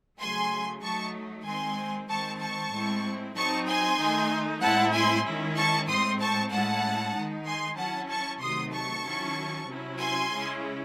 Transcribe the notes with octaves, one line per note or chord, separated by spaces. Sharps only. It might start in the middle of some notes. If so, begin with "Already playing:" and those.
C#3 F#3 A3 G#5 C6
F#3 A3 D#4 A5 C#6
D#3 G#3 C4 G#5 C6
D#3 G#3 C4 A5 C#6
A5 C#6
A2 G#3 C4 E4
F#3 C4 D#4 A5 C#6
G#5 C6
D#3 A3 D#4
A2 G#3 C4 E4 F#5 A5
G#5 C6
D#3 G#3 C#4 E4
A5 C#6
A2 G#3 C4 C6 D#6
A5 C#6
A2 G#3 C#4 E4 F#5 A5
D#3 G#3 D#4
G#5 C6
F#3 C#4 E4 F#5 A5
A5 C#6
C3 D#3 F#3 A3 D#4 C6 D#6
A5 C#6
D#3 F#3 C#4 E4
C3 F#3 C#4 E4
G#5 C6
C#3 G#3 C#4 E4